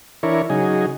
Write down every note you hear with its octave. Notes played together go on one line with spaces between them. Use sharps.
E3 D4 E4 A#4 C#5
C#3 F#3 D#4 G#4